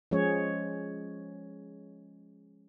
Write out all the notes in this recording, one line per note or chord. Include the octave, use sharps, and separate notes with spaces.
F3 G#3 C#4 G#4 C#5